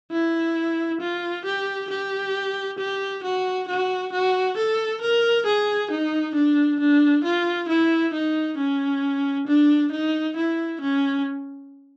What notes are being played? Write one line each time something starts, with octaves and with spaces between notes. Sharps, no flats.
E4
F4
G4
G4
G4
F#4
F#4
F#4
A4
A#4
G#4
D#4
D4
D4
F4
E4
D#4
C#4
D4
D#4
E4
C#4